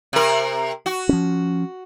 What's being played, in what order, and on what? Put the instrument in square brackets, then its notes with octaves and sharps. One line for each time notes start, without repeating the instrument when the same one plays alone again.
[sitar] C3 A#4
F#4
[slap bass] F3 C#4